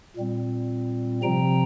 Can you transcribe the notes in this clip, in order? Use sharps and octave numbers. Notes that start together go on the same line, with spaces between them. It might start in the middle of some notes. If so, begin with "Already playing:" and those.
A#2 G3 C4
C3 F3 C4 G5 A#5